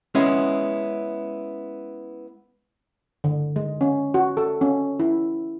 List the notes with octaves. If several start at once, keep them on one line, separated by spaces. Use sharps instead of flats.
G#3 B3 C#4 E4
D3
G#3
C#4
F#4
A4
C#4
E4